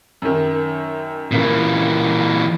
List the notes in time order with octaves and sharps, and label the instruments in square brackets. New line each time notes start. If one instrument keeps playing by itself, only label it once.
[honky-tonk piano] F#2 D#3
[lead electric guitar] A#2 E3 [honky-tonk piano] C#3 A#3